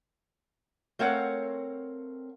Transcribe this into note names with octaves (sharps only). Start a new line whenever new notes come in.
A3 C4 A#4 C#5 F5 F#5